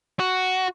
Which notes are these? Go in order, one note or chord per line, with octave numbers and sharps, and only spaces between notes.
F#4